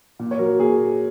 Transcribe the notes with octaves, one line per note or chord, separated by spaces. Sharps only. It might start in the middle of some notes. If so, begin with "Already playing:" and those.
A#2
C#5
F#3 A#4
A#2 G#4